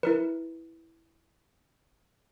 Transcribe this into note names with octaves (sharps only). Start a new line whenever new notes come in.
E4 A#4 B4